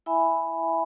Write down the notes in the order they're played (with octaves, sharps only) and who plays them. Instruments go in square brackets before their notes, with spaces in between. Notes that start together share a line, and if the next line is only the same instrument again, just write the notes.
[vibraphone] E4 E5 G#5 B5